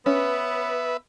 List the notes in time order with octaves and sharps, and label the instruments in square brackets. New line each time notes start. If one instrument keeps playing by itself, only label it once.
[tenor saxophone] B3 [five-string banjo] C#4 [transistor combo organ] B4 E5